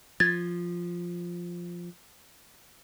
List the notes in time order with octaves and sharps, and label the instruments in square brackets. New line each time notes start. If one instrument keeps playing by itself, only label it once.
[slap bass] F3 [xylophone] G#6 A6